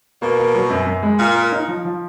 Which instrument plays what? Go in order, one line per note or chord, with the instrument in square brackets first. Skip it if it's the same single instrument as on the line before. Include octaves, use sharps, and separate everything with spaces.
[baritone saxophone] B2 [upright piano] A#3
[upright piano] A#3
F#3
F#2
F#2
G#3
[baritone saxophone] A#2 [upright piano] A#4
[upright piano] A#4
D#4
F3
F3